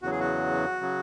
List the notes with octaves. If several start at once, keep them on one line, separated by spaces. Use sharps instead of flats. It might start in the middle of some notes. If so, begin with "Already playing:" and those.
E2 C#3 F#3 F#4
G#4
F#4
C#3 F#3